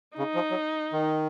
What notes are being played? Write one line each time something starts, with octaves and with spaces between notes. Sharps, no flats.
C#3 D#4
F3
F#3
D#3